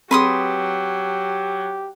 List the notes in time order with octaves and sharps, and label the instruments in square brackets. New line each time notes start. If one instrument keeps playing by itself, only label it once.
[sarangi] F#3 [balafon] C4 G#4 [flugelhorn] G4 [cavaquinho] B4 C6 D#6